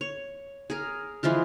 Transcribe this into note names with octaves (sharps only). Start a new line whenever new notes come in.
C#5
G#4 A#4
E3 F3 G#3 F4